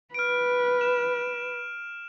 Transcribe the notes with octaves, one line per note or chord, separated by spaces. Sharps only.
B4 F6 D7
E7